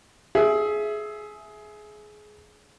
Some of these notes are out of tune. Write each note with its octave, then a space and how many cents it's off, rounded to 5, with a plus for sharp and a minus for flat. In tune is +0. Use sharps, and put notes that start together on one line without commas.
G#4 +20 E5 +0